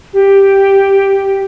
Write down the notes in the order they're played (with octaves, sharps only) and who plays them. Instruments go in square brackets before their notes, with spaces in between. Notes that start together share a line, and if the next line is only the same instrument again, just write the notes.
[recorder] G4